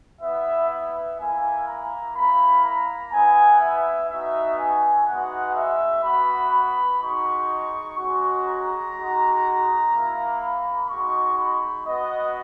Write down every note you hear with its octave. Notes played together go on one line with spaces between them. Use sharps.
B3 E4 E5
E5
A#3 E4 G#5
A#5
A#3 E4 B5
A#5
B3 E4 G#5
E5
B3 D#4 F#4 E5
G#5
G#3 B3 D#4 F#4 F#5
E5
B3 F#4 B5
B5
G#3 D#4 F#4 C#6
G#3 C#4 F#4
A#5
G#3 D#4 F#4
A#3 E4
B5
G#3 D#4 F#4 C#6
B5
B3 F#4 D#5